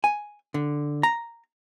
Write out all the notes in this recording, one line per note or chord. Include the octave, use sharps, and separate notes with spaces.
G#5
D3
A#5